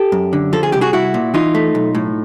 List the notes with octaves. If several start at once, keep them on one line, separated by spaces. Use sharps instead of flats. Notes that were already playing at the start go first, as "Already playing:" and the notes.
Already playing: G4 A4
F#2
D3
F3 A4
G#4
C2 G4
F#4 G#4
C2 E4 F#4
A#2
E3 D#4 F4
A3
B1
A2